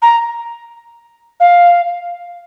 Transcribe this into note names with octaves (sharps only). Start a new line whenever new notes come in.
A#5
F5